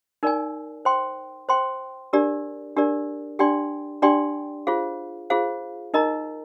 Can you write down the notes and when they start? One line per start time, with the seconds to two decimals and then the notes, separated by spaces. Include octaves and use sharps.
0.23 D#4 A#4 D5 G#5
0.85 C5 G5 C6
1.49 C5 G5 C6
2.13 D4 G4 A#4 D5
2.76 D4 G4 A#4 D5
3.39 D4 G4 D5 G5 C6
4.02 D4 G4 D5 G5 C6
4.67 F4 G#4 C5 F5
5.30 F4 G#4 C5 F5
5.94 D#4 A#4 D#5 A#5